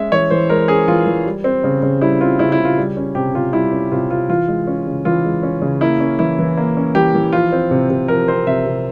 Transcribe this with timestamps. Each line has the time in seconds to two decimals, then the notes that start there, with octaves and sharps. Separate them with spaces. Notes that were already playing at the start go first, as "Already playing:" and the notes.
Already playing: G#3 C#4 E5
0.12 E3 C#5
0.30 E3 C5
0.50 G#3 A#4
0.68 C#4 G#4
0.88 E3 F4
1.06 E3
1.25 G3
1.44 C4
1.64 C#3
1.82 C#3
2.01 G3 E4
2.21 C4 F4
2.39 C#3 E4
2.52 E4
2.59 C#3
2.65 F4
2.78 G3
2.97 C#4
3.15 C3 G4
3.35 C3 F4
3.53 G3 E4
3.72 C#4
3.92 C3 F4
4.10 C3 F4
4.29 E3 F4
4.48 G#3
4.67 C#4
4.87 C#3
5.05 E3 F4
5.25 G#3
5.43 C#4
5.62 C#3
5.81 A#3 E4
6.00 C#4
6.19 E3 E4
6.39 E3
6.57 A#3
6.77 C#4
6.95 E3 G4
7.14 E3
7.32 F3 F4
7.52 C4
7.71 C3
7.90 C3
8.08 F3 A#4
8.28 C4 C5
8.47 C3 E5
8.66 C3